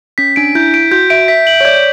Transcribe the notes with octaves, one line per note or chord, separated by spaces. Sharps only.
C#4 B6
D4 D7
E4 G6
D7
F#4 G6
E5 D7
E5 B6
F#7
C#5
D5 G6